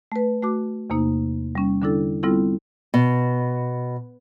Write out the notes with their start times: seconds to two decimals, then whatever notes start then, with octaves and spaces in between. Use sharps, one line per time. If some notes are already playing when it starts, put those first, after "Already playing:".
0.12 A3 B4
0.43 A3 F#4 D6
0.90 E2 C3 A#3 D#4
1.55 G3 C#4
1.82 D3 G3 D4 E4 A4
2.23 G3 B3 C4 E4 F4 A4
2.94 B2